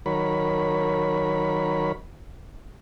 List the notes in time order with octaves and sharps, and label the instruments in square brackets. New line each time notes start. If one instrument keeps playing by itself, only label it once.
[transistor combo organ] D#3 F#3 A#4 C#5 B5